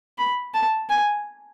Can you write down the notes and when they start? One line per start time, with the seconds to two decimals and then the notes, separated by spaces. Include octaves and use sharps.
0.18 B5
0.54 A5
0.89 G#5